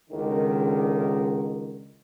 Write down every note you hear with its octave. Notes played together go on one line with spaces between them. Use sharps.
C#2 D3 D#3